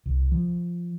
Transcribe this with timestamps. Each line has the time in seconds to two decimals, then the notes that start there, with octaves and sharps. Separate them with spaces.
0.06 C2
0.32 F3